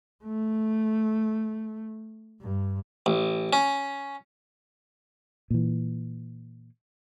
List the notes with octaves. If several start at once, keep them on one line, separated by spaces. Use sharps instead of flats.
A3
G2
A1
C#4
A#2 E3